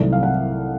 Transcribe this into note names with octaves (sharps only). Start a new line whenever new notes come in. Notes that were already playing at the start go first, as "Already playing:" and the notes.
Already playing: C2 C3 D#3 F#3 A3 D5
F5
F#5